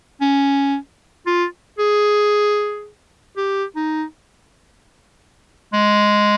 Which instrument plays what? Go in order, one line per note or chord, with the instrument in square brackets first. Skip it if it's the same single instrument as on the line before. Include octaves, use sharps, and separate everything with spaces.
[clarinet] C#4
F4
G#4
G4
D#4
G#3